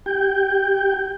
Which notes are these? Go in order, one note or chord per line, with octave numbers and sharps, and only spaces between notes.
G4 G5